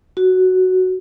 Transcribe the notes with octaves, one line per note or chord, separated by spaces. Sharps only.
F#4